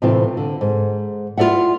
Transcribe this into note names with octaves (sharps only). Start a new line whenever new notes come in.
A2 C3 E3 A3 C4 F4
D3
G#2
E4 F4 A4 D5 E5 F#5